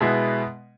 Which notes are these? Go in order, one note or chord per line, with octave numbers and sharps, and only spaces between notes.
B2 G#3 B3 E4